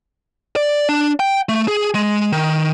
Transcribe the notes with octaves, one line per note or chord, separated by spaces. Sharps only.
D5
D4
G5
A3
G#4
G#3
D#3